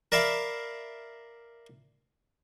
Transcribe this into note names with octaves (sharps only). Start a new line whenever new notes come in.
A#4 D5 E5 F5 B5